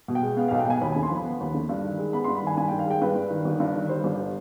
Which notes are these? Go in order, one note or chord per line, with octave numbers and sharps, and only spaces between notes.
B2
G5
G#3
B3 F5
B1 F5
G5
B2 G#5
D#2 B5
D3 G#5
C6
F3 B5
B3
D#2
D3
G2
D#3
G#3
B3 B5
G2 C6
B5
D#3 G#5
G2 G#5
D#3 G5
F5
G#3 G5
G2 B4
G2
D#3
G1
G2
D#3
G3 C5
G1